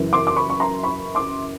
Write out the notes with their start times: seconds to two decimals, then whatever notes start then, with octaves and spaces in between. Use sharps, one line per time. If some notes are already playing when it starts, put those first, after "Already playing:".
Already playing: F#2 C#3 E3
0.13 C6 D6
0.27 D6
0.36 B5 C#6
0.50 C#6
0.60 A#5 C6
0.83 B5 C#6
1.15 C6 D6